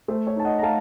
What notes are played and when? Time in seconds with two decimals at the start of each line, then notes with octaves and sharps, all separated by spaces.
0.08 A3 C5
0.27 C#5
0.36 D#4 A5
0.45 D#5 F#5
0.59 A#5
0.63 A3 F5 A5